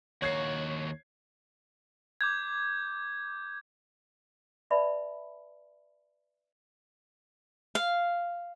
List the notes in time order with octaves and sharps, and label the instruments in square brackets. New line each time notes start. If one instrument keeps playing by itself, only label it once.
[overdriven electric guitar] D#2 F#4 [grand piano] C#5 G#6 C7
[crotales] D6 G6 G#6
[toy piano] B4 D5 E5 A5 B5
[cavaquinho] F5